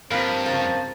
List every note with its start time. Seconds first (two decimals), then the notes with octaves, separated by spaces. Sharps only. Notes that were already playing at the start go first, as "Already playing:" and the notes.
0.11 G2 F3 A#3 C4 B5
0.46 C#3 F3 A#3 A5